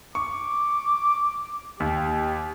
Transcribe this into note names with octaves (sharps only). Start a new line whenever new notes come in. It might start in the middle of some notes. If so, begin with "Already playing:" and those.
C#6 D6
D#2 G4